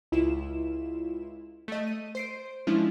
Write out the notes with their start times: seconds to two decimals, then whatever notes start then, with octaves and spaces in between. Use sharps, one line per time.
0.12 C#2 E4 F4 E7
1.68 A3 D#5
1.87 D#7
2.15 C5 C7 D7
2.67 F3 G#3 C#4 D4 E4 F4